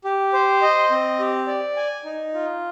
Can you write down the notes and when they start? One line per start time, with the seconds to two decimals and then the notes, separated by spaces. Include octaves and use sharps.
0.04 G4
0.33 C5
0.62 D#5
0.91 C4
1.19 G4
1.47 D5
1.76 G#5
2.05 D#4
2.34 F4